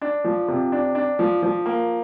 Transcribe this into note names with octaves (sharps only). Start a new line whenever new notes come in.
D4
F3
C3
D4
D4
F3
F3
A#3